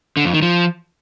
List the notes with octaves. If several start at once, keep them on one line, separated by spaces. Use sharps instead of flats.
D3
F2
D#3
F3